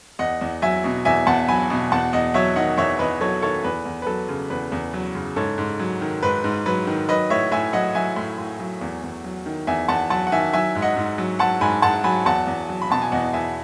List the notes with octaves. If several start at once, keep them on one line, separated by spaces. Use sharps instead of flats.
E2 D#5 F#5
E2
F#3 E5 G#5
B2
E2 E5 G#5
E2 F#5 A5
F#3 G#5 B5
B2
E2 F#5 A5
E2 D#5 F#5
F#3 C#5 E5
D#3 D#5 F#5
E2 C#5 E5
E2 B4 D#5
F#3 A4 C#5
D#3 A4 C#5
E2 B4
E2
B4
F#3 A4
C#3
E2 B4
E2
F#3
C#3
G#2 A4 C#5
G#2
F#3
D#3
G#2 B4
G#2
F#3 B4
D#3
F#3 B4 D#5
A2 C#5 E5
A2 E5 G#5
F#3 D#5 F#5
F#3 E5 G#5
A2
A2
F#3
E2
E2
F#3
D#3
E2 E5 G#5
E2 F#5 A5
F#3 F#5 A5
F#5
D#3 E5 G#5
F#3 E5 G#5
G#2
D#5 F#5
G#2
F#3
F#3 F#5 A5
G#2 G#5 B5
G#2 F#5 A5
F#3 G#5 B5
E2 F#5 A5
E2
F#3
B5
B2 A5
G#5
E2 D#5 F#5
E2 E5 G#5